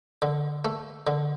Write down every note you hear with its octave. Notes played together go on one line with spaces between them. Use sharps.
D3
A3
D3